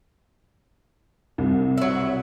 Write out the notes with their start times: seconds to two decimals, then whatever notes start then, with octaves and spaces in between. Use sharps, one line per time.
1.38 C2
1.78 F#3 E4